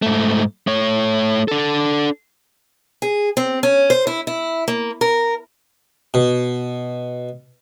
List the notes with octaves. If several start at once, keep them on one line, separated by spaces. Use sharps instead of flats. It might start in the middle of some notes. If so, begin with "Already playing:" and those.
G#2 A3
A3 C#5
D4 A4
G#4
C4
C#4
C5
E4
E4
A#3
A#4
B2